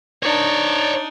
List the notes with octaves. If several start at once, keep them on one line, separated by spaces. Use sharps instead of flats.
D4 D#4 C#5 D5